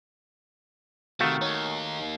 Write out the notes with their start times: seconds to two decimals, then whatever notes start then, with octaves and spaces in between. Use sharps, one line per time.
1.20 C3 D#3 A3 F#4 F5 C#6
1.42 A#3 D#4 C#5